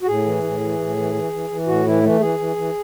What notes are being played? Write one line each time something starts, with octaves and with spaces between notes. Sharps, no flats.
F#4
A2 G#4
E3
A2
E3
A2
E3
E3
E3
E3
A2 F#4
E3 E4
E3 A3
E3 G#4
E3
E3